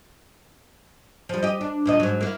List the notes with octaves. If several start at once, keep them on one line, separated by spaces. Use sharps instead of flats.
F3 G3
G4 D#5
D4
D2 A#2 D#5
G#2 F#3
A#3 E4